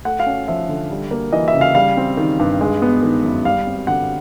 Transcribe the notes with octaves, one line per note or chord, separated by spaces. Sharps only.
A3 F#5
F5
C#4
F3 E5
D3
G3
A#3
E3 D#5
E5
C#3
F5
G3 F5
C4
D#3
G2
G#3
B3
D#3
F#2
G3 F5
C4
D3 F#5